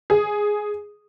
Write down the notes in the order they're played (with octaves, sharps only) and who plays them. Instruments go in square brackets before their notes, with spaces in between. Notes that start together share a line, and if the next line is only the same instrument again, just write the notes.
[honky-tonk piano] G#4